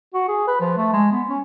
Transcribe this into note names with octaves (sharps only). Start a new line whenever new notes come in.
F#4
G#4
B4
F3
A3
G#3
B3
C#4